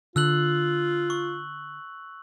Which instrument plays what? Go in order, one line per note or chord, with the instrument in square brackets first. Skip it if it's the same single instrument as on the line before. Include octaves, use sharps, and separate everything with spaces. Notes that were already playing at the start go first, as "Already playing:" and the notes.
[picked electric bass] D3 [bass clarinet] F4 [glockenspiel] E6 F#6 F#7
[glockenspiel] C#6